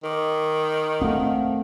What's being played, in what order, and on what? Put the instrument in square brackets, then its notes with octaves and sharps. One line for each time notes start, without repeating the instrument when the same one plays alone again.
[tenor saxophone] D#3 [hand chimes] A#4 D6
[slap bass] A3 C4 [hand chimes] A4 F5 F#5